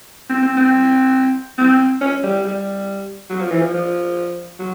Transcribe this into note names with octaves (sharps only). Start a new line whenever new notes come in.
C4
C4
C4
C4
C#4
G3
G3
F#3
F3
E3
F3
F3
F#3